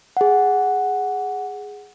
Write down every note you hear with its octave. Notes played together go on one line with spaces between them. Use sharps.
G#4 F#5